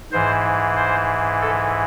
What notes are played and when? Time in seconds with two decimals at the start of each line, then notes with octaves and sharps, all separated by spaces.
0.12 G#2 E3 C5
0.76 C5
1.41 A4